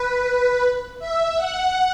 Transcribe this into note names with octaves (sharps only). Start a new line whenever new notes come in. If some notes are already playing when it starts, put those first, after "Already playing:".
Already playing: B4
E5
F#5